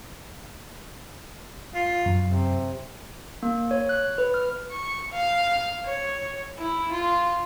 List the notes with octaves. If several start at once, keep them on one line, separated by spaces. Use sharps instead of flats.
F4
F#2
C3
A#3
C#5
F#6
B4
F6
C#6
F5
C#5
E4
F4